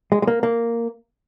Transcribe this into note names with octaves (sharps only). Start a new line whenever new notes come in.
G#3
G#3
A#3
A#3